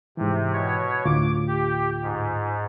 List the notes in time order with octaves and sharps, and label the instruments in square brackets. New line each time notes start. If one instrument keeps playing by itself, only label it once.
[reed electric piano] G#2 E3 [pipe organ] C3
[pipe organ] B2 C#5
[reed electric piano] D2 A2 F4 [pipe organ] D6
[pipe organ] G4
G#2